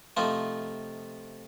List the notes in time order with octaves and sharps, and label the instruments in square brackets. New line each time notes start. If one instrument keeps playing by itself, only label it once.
[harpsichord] C3 F3 A3 D#4 F4